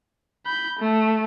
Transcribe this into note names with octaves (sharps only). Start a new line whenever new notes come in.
B5 G6
A3